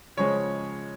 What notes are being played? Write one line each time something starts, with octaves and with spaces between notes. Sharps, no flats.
C#2 C#3 F3 G#3 C#5